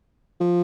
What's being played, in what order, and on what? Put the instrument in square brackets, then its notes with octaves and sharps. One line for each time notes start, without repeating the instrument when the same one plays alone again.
[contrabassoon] F3